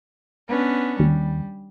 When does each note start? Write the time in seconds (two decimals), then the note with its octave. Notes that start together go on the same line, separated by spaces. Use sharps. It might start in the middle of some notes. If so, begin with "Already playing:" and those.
0.49 B3 C#4 D4
0.99 D#2 G3